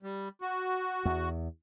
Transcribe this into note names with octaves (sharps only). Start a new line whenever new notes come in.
G3
F#4
E2